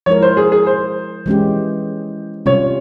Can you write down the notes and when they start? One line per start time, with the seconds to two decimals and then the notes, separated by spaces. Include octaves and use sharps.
0.06 F3 G#3 E4 A#4 C#5
0.22 C5
0.37 G#4
0.52 G#4
0.66 C5
1.26 E3 G#3 C#4 G4
2.46 C3 G3 C#4 F4 C#5